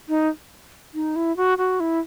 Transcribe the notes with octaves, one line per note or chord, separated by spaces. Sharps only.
D#4
D#4
E4
F#4
F#4
E4